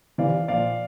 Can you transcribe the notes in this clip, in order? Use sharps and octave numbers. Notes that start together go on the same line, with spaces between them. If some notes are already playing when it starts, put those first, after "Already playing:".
C3 E3 D5 F5
A#2 F3 D5 F5